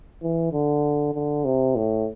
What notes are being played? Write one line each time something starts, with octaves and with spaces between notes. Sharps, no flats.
E3
D3
D3
C3
A2